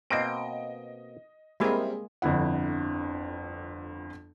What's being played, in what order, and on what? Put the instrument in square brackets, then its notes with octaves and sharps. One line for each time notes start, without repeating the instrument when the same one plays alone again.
[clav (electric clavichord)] B2 A#3 C4 [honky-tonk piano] D#5 D7
[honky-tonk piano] G3 C4 A#4 [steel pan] G#3 A#3 G#4 [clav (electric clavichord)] E4
[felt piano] G1 F2 D3 E4 F#5